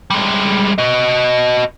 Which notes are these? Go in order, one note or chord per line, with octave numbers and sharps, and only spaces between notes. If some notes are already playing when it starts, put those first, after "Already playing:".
G3 G#3
F#4 D#5